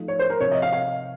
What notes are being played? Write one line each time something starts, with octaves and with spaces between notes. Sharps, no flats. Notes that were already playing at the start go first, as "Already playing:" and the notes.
Already playing: F3 A3 D#4
C#5
C5
A#4
C3 F3 C4 C#5
D#5
F5
F5